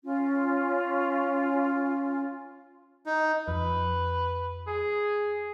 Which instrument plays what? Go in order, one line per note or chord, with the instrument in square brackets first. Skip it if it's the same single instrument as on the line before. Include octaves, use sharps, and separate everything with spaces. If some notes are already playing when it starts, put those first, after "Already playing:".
[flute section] C#4 F4
[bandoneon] D#4
[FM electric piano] F2 [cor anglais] B4
[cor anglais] G#4